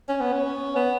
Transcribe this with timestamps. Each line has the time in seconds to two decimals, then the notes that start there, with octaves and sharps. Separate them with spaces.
0.09 C#4
0.21 B3
0.33 C#4
0.76 B3